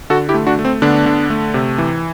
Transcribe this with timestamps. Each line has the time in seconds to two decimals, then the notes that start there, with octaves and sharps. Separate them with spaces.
0.10 D3 F#4 A4
0.29 E4 G4
0.34 A3
0.47 D4 F#4
0.59 A3
0.65 C4
0.82 D3 B3 D4
1.06 D3
1.30 A3
1.54 C3
1.78 E3